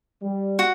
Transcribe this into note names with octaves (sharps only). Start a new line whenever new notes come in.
G3
F#4